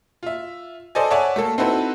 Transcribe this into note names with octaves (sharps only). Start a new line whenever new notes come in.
F4 E5
A4 C5 D5 D#5 G#5
C#5 D5 E5 F#5 G#5 A5
A3 A#3 A4
C4 D#4 E4 F#4 A4 B4